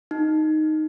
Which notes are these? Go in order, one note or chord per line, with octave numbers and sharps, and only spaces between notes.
D#4